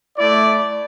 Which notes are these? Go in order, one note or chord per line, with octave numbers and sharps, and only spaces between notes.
A3 E4 D5